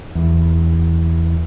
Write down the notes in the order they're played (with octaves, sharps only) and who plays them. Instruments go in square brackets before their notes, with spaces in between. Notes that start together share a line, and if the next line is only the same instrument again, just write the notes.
[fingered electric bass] E2